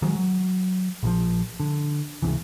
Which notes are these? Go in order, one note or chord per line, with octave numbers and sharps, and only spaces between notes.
D#3 F3 F#3 G#3
F#3
A#1 E3 F3
D3
C#2 C3 E3